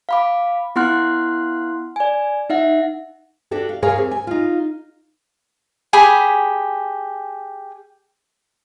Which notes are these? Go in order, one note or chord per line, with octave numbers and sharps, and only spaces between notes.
F5 B5 D6
B3 E4 F#5 C6 F6 F#6
D5 G#5
D#4 E5 F#5
D4 F#4 G4 A4
F5
G#4 A#4 C#5 F5 G#5
C4 G4
G#5
D#4 F4
G4 G#4 G#5 B5